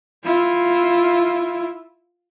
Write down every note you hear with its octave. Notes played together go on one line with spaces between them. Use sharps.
E4 F4